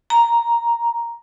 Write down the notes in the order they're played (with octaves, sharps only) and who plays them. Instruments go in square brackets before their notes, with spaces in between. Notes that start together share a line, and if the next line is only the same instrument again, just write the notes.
[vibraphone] A#5